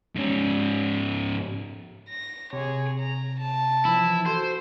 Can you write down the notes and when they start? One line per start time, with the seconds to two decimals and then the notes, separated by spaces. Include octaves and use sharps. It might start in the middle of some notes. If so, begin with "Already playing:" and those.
0.16 G#2 C#4
2.09 A#6
2.53 C3 G#4 C#5
2.98 A#5
3.39 A5
3.85 E3 F3 E4
4.26 F#4 A4 C5